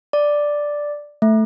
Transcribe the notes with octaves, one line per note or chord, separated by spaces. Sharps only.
D5
A3